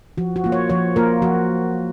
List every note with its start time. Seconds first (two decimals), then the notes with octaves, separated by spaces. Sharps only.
0.18 F3 F#4
0.36 F#4
0.44 A#3 F4
0.52 C#5
0.70 F3 C#5
0.96 A#3 F4 A#4
1.22 F3 F#4